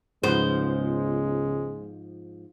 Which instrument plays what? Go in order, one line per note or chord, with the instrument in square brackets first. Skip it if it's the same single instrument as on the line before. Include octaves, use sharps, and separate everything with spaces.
[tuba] C#2 [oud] G#2 F3 B3 [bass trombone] G#3 [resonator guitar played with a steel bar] C5